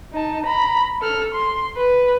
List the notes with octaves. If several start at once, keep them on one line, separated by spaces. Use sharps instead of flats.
D#4 A5
A#5 B5
A4 F6
C6
B4